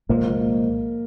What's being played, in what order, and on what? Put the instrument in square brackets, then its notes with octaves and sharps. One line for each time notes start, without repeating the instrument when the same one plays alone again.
[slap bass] C2 A#2 F3 G#3 [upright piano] A#3